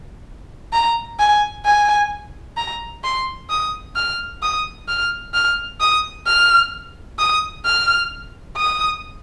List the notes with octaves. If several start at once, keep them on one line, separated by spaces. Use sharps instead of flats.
A#5
G#5
G#5
A#5
C6
D#6
F6
D#6
F6
F6
D#6
F6
D#6
F6
D#6